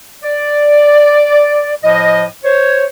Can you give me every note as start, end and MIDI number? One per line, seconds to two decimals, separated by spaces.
0.24 1.76 74
1.83 2.24 45
1.83 2.24 53
1.83 2.24 75
2.43 2.84 72
2.43 2.84 73